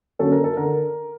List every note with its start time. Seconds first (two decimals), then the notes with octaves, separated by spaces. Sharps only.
0.19 D3 F#3 A#3 C#4 A4
0.32 A#4
0.44 A4
0.57 D3 A#4